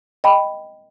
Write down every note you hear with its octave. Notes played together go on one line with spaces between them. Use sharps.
D#5 G5 B5